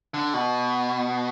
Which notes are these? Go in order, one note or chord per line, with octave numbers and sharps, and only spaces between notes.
D3
B2